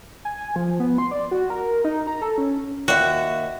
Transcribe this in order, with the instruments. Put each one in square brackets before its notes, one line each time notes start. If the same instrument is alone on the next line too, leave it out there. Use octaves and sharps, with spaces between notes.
[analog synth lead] G#5
F3
B3
C6
D5
F#4
A#4
D#4
A#5
A4
C#4
[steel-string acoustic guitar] D#2 E5 [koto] F#4